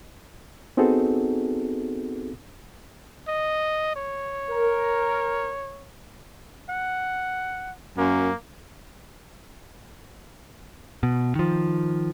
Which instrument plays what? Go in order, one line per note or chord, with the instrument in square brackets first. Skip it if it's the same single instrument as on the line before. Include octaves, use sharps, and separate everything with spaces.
[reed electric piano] B3 C4 D#4 F#4 G#4 A4
[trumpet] D#5
C#5
[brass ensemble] A#4
[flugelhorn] F#5
[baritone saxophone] F#2 [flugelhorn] A#3
[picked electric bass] B2
D#3 F3